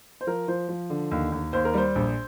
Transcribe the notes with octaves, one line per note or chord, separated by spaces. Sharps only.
C5
F3 A#4
F3 C5
F3
D3
D#2
D#2
D#2 C5
A#4
G3 C5
A#1